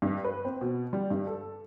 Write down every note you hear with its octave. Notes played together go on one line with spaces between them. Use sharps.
G2
B4
C4
B2
G3
G2
A4